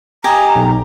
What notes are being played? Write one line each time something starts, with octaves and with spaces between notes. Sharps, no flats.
G4 D#5 G#5 A#5
B1